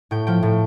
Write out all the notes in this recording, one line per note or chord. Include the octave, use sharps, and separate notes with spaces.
A2 G5
F3 G5
A2